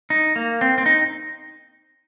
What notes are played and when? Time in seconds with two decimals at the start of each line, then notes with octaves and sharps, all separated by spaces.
0.10 D#4
0.36 A#3
0.61 C4
0.78 C4
0.86 D#4